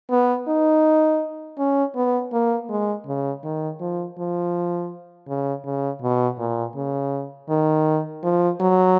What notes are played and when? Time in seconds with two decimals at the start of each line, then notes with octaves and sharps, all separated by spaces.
0.11 B3
0.48 D#4
1.58 C#4
1.95 B3
2.32 A#3
2.69 G#3
3.07 C#3
3.44 D#3
3.80 F3
4.17 F3
5.28 C#3
5.64 C#3
6.02 B2
6.38 A#2
6.75 C#3
7.49 D#3
8.23 F3
8.60 F#3